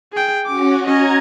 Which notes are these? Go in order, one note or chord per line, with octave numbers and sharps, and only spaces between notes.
G#4 G5
C#4 F#4 D6
C#4 D#5 A#5 G#6